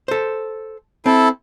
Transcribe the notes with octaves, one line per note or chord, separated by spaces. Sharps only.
A4 C5
C4 E4 A4